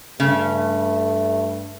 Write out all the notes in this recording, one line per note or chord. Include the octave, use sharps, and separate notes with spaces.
G2 C#3 A3